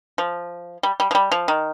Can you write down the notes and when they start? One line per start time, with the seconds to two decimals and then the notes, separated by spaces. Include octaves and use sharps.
0.18 F3
0.83 G3
1.00 G3
1.11 F3
1.15 G3
1.32 F3
1.48 D#3